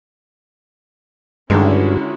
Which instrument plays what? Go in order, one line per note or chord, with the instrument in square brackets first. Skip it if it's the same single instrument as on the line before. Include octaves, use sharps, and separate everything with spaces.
[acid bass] G2 [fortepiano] D3 D#3 G#3 [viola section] C#4 E4 F#4